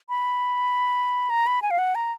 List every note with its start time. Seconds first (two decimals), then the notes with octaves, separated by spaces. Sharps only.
0.09 B5
1.30 A#5
1.47 B5
1.62 G#5
1.71 F5
1.78 F#5
1.95 A#5